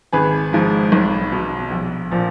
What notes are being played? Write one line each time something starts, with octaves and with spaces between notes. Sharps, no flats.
G#1 G#4 B4
G#2 F3
B1
B2
A#1
A#2 F3